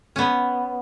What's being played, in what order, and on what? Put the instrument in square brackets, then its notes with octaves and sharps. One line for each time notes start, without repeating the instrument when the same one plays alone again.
[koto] B3 C#4